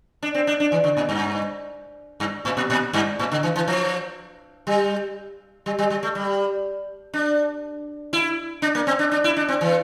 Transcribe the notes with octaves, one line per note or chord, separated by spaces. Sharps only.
D4
C4
D4
D4
E3
D3
A#2
G2
G2
A2
A#2
A#2
G2
A2
D3
E3
E3
F3
G3
G3
G3
G3
A3
G3
D4
E4
D4
A#3
C4
D4
D4
E4
D4
C4
E3